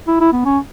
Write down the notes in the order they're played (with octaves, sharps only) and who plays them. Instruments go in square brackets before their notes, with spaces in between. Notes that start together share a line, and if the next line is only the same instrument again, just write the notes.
[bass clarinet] E4
E4
B3
C#4